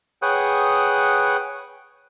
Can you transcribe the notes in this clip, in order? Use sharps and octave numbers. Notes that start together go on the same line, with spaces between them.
G#4 B4 C#5 F#5 G5 D#6